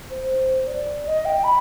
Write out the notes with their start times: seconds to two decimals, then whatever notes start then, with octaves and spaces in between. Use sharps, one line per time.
0.10 C5
0.67 D5
1.06 D#5
1.25 G5
1.44 B5